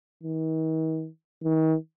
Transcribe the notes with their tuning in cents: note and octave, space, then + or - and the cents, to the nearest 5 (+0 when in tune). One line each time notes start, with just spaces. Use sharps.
D#3 +45
D#3 +40